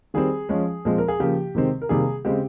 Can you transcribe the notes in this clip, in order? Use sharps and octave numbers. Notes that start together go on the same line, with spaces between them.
D#3 G3 C4 G#4
F3 G#3 C#4
A#2 F3 G#3 C4
A#4
G#4
C#3 F3 A#3 G4
C3 D#3 G#3 C4
A#4
C3 D#3 G3 A#3 G#4
C#3 G#3 C4 G4